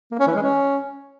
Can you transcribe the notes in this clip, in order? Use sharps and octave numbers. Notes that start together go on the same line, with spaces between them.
A#3
C#4
E3
G#3
C#4